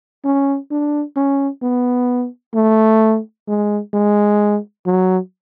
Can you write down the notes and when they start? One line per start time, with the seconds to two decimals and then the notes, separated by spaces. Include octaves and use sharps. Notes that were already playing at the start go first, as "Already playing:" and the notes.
0.25 C#4
0.71 D4
1.16 C#4
1.62 B3
2.54 A3
3.48 G#3
3.93 G#3
4.86 F#3